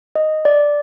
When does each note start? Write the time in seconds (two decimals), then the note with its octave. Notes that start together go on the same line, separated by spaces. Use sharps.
0.16 D#5
0.45 D5